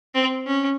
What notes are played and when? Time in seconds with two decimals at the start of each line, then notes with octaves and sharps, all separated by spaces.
0.14 C4
0.46 C#4